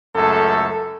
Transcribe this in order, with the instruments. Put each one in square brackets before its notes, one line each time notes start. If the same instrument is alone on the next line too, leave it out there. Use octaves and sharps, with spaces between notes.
[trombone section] C#2 F#2 A3 A4